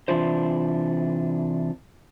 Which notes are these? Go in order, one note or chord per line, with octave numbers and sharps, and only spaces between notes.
C3 E3 D4 E4 F4 C5